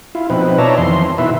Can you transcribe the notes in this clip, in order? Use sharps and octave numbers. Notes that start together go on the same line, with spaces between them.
E4 F4
B2 F3 C4 D#4 B4
D#4 C#5 D5 E5 A5 A#5
F2 D#3 E3 C6
B2 D#3 E4 B4 E5